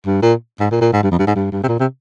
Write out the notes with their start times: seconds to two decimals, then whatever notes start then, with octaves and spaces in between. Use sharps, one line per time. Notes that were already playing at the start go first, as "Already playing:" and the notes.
0.06 G2
0.22 A#2
0.60 G#2
0.71 A#2
0.81 A#2
0.93 G#2
1.03 G2
1.11 F2
1.19 G2
1.27 G#2
1.35 G2
1.52 G2
1.63 C3
1.68 A#2
1.79 C3